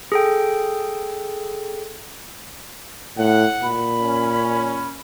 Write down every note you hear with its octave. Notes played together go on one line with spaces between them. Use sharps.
G#4 A4 G5
A2 F#5
A#2 B5
C#4